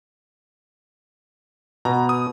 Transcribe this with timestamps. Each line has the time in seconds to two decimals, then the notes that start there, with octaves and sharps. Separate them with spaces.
1.85 B2 A#5
2.09 D#6